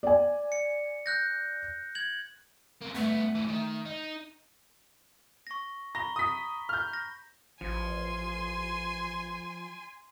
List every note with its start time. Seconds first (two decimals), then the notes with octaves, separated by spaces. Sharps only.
0.03 D5 G#5
0.52 C#7
1.06 F#6 G6 A#6
1.95 G#6 F#7
2.82 C3 A#3
2.95 G2 A3 B3
3.35 C#2 E3
3.49 D#3
3.86 D#4
5.47 C#6 A#6
5.95 A#5 B5 A#6 G7
6.16 D#6 B6
6.69 F6 G6
6.93 A#6
7.61 A1 F3 G#5 C6